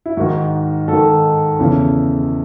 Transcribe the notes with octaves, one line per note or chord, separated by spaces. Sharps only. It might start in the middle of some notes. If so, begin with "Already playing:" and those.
E4
G#2 D#3 F#4
G#2 A4
D#3
E2 C#3 E3